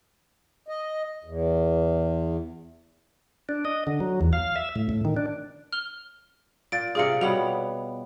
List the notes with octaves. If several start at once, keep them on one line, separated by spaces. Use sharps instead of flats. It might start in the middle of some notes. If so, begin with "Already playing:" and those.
D#5
E2
D4
D#5
D3
F#3
E2
F5
E5
A2
A2
D#3
D4
F6 F7 G7
A#2 A6 D7
C3 F4 G#4 D5 C#7
B2 G3 B3 C#5 F7